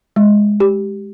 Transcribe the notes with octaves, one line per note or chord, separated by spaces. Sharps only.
G#3
G4